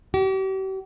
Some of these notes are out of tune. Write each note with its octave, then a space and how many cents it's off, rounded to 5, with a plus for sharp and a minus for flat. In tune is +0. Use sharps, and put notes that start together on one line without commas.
G4 -40